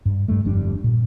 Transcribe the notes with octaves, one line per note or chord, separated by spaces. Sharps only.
G2
G2 G3 A3
G1 F2 G3 D4
A#2